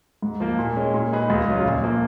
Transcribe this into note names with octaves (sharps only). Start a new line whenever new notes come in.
G#2
F3 A#3
A#2
G#3 C#4
A#2
G#3 D#4 G#4 B4
C#2
C#3 F#3 C#4 F4
A#1
F3 A#3